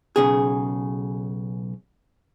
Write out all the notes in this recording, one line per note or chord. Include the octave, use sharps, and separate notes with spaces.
B1 C#3 G#4